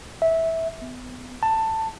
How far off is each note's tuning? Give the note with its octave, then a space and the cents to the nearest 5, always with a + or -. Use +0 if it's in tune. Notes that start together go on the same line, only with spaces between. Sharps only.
E5 -15
B3 +25
A5 +15